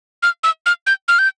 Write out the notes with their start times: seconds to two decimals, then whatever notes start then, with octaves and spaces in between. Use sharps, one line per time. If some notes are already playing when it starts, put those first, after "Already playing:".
0.23 F6
0.44 E6
0.66 F6
0.87 G6
1.08 F6
1.19 G6